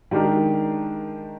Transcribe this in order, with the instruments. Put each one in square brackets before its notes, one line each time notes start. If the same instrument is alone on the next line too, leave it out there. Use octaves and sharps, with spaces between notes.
[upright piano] D#3 G#3 D4 G4 A#4